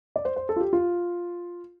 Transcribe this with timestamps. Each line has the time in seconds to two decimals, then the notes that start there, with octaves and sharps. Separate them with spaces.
0.16 D5
0.25 C5
0.36 C5
0.49 A4
0.56 F4
0.60 G4
0.73 F4